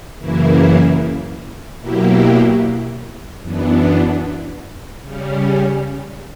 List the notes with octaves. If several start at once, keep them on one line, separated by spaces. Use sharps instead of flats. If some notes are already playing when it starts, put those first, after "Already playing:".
F#2 C#3 E3 A#3 E4
B2 F#3 A#3 E4 G4
F#2 E3 B3 D4
C#3 G3 C#4